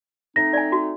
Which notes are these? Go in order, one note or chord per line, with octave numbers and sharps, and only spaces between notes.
A3 C4 D#4 A#6
D5 G#5
F#4